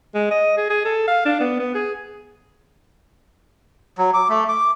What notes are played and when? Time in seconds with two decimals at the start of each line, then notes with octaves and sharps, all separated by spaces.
0.14 G#3
0.31 D#5
0.57 G#4
0.70 G#4
0.85 A4
1.08 F5
1.25 D4
1.40 B3
1.59 B3
1.75 G#4
3.98 F#3
4.14 D6
4.29 A3
4.49 D6